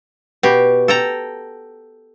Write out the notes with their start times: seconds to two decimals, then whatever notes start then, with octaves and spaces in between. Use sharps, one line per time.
0.43 B2 G4
0.88 A4 G5 A#5